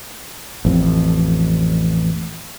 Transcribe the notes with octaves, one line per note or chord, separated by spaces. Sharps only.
A1 F2